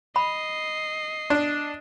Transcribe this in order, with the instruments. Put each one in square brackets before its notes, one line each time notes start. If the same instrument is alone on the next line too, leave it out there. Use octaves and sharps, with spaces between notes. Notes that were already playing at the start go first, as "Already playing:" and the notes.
[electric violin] D#5 C7 [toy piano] B5
[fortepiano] D4